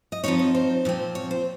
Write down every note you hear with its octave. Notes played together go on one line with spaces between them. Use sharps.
D#5
F3 C4 D#4 C#5
C#5
C5
A#2 F3 C4
C#5
C5